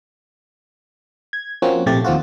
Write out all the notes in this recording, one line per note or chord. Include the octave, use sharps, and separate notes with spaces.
G#6
F3 A#3 C4 C#4 F#4
A#1 A2 C3 A3 G4 A6
D#2 F3 C4 F4 F#4